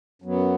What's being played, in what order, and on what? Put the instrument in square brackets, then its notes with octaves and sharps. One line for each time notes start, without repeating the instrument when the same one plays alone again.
[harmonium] F#2 F#3 B3